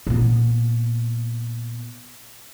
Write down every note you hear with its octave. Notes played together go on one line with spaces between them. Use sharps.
A#2 B3